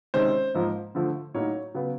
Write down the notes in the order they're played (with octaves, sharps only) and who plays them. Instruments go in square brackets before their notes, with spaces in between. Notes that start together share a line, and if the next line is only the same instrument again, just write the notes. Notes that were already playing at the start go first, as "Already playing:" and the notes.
[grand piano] C3 D#3 G#3 C#4 C5
G#2 F3 A#3
D3 F3 A3
A2 F#3 A#3 D#4 C#5
C#3 F#3 B3